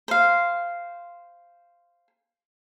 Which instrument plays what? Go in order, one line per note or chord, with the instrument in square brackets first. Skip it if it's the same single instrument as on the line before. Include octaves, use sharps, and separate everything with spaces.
[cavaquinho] C5 F5